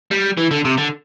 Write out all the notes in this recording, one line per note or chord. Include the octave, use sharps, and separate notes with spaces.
G3
E3
D3
C3
D3